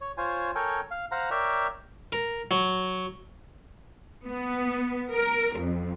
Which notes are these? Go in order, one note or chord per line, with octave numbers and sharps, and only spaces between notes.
C#5
F4 C5 C#5 G#5
A4 A#4 C#5 G5 G#5
F5
C5 F5 F#5 A#5
A#4 C#5 D5 E5 G5
A#4
F#3
B3
A#4
F2